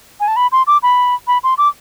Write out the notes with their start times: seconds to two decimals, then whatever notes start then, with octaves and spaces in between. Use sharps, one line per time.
0.20 G#5
0.28 A5
0.36 B5
0.52 C6
0.67 D6
0.83 B5
1.27 B5
1.44 C6
1.58 D6